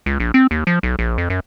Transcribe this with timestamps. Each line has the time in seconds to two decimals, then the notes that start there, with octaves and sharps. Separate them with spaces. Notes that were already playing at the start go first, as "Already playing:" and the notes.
0.06 C#2
0.20 A#1
0.34 C4
0.51 D#2
0.67 F3
0.83 B1
0.99 A#1
1.18 F2
1.30 F#2